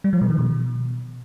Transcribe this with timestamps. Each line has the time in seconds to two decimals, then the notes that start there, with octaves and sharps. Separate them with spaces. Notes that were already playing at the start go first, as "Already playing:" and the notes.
0.04 G3
0.13 F3
0.21 B2
0.30 D#3
0.38 B2